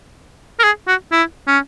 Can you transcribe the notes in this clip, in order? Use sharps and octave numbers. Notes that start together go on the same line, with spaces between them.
A#4
G#4
F#4
E4
C#4